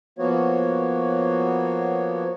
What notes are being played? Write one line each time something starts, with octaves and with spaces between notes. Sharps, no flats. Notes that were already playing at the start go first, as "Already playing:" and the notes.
F3 A#3 B3 F#4 C#5